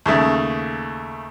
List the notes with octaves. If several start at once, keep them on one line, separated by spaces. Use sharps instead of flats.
D#2 C#3 A3